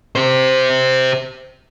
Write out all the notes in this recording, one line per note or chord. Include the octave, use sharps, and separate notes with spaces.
G4 C5